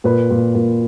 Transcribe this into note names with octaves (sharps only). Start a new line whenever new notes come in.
A#2 B4
A#2
A#2